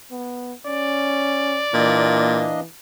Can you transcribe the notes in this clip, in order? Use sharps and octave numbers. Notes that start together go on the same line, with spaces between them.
B3
C#4 D5
A#2 E3 A#3 D4 D#5